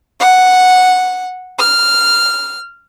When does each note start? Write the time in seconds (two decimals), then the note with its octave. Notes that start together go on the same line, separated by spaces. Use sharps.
0.20 F#5
1.58 F6